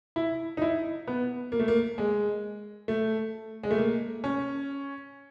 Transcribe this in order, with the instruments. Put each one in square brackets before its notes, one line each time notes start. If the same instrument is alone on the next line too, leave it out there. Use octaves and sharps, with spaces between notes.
[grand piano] E4
D#4
E4
B3
A#3
A3
A#3
G#3
A3
G#3
A3
A#3
C#4